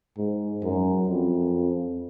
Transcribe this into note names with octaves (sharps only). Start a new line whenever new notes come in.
G#2
F#2
F2